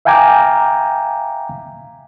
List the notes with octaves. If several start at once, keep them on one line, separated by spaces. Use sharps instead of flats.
E5 F5 G5 G#5 A#5 D6